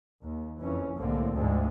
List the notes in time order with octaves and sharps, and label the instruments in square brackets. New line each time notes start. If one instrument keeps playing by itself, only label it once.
[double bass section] D#2
F#1 F2 E3 C#4
C2 A2 D3 G#3 A#3 C4
D2 G#2 D3 F3 G#3